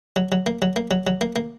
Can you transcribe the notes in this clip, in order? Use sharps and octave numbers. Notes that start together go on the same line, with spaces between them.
F#3
F#3
A#3
F#3
A#3
F#3
F#3
A#3
A#3